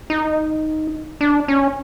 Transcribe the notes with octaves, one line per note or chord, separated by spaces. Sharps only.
D#4
D4
C#4